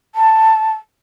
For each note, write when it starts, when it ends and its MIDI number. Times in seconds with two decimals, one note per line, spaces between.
0.15 0.73 81